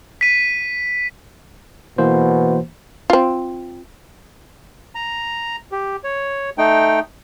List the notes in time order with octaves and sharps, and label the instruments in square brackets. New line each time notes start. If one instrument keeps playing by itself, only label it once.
[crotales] B6 D#7
[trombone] B2 [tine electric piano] E3 A#3 C5
[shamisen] C4 F4
[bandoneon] A#5
G4
C#5
A3 D#4 G5